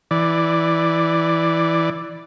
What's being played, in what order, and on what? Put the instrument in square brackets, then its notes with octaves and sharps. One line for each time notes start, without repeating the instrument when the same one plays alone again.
[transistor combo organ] E3 D5